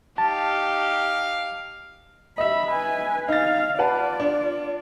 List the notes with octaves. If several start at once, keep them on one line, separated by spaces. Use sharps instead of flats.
D#4 G4 F5 A5
D#5 E5 B5
B4 G#5
D#4 F5 A6
F4 B4 D5 F#5 A5
D4